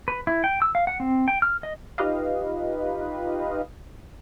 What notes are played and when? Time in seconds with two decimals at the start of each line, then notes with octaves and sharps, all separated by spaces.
0.08 B4
0.27 E4
0.44 G5
0.62 E6
0.75 F5
0.87 F#5
1.00 C4
1.28 G5
1.42 F6
1.63 D#5
1.98 D#4 F4 G4 B4 D#5 F5